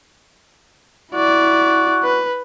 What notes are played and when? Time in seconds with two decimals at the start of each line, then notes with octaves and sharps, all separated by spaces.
1.13 E4 F#4 D5
2.04 B4